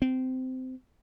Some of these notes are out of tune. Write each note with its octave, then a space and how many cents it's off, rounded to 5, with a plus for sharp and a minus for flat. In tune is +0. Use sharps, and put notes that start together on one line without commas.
C4 -20